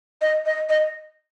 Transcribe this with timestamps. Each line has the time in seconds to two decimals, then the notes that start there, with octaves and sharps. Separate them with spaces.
0.21 D#5
0.46 D#5
0.69 D#5